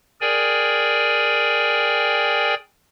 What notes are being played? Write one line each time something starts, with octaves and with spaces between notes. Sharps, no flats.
G#4 A#4 D5 G5 G#5